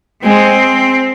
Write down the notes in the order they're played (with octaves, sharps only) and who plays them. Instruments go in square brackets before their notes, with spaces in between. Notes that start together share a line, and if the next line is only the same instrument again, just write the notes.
[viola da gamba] G#3 [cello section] C4